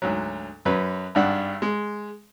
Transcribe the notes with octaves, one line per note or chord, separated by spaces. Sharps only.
D2 G#2 F#3
F#2 F#3 B4
G#1 G2 D4 F#5
G#3